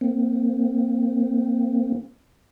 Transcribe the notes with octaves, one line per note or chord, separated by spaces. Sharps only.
A#3 C4